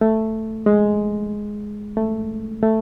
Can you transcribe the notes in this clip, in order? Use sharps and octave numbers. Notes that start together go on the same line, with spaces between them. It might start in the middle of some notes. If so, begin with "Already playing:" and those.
A3
G#3
A3
A3